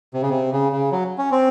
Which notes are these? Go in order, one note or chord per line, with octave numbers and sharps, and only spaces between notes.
C3
C#3
C3
C#3
C#3
F#3
C#4
C4